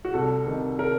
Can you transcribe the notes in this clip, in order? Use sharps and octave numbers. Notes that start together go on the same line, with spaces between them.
F#4
C2 A4
C3 D#3
A#4